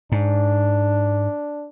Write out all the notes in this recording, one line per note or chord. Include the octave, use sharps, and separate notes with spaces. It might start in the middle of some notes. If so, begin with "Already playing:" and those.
G#2 D4